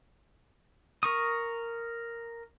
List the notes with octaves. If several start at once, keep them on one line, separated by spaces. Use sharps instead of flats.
A#4 C#6 D#6